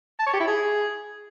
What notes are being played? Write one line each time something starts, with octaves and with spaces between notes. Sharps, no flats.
A5
C#5
G4
E4
G#4